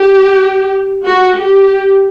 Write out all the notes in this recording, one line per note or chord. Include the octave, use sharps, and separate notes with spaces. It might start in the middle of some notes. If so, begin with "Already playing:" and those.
Already playing: G4
F#4
G4